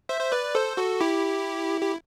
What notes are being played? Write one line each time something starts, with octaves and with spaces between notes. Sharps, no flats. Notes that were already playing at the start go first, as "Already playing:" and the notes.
C5 E5
C5
B4 D5
A4 C5
F#4 A4
E4 G4
G4